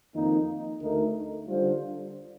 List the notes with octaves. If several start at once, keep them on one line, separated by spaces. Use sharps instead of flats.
F2 D#3 A#3 D#4
D2 D3 A3 D#4 A#4
D3 G3 D4 F4 C5